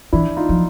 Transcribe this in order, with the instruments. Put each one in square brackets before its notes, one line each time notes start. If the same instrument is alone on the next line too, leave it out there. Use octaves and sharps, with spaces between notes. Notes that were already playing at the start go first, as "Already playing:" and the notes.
[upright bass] E3 [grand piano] D4 E4
[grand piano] D#4 F4
[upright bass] F3